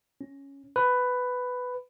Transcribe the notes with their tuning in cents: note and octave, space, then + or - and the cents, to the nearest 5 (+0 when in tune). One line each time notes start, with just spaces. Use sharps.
C#4 +0
B4 +10